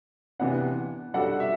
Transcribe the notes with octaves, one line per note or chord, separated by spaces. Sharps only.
C3 E3 B3 D4 F#5
G3 D4 F#4 A4 F#5
E5